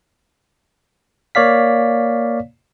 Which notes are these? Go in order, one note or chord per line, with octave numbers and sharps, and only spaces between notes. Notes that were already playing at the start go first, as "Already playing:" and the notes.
A#3 C#5 D5 F5 B6